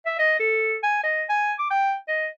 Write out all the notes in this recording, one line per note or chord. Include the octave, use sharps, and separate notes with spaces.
E5
D#5
A4
G#5
D#5
G#5
D6
G5
D#5